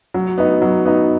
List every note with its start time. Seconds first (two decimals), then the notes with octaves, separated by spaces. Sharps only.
0.14 F#3
0.38 B3 D#4
0.62 F#3
0.85 B3 D#4